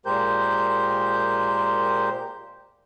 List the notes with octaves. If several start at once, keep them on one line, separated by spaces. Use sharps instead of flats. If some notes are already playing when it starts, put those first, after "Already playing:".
A#2 G#3 G4 A#4 C5 G6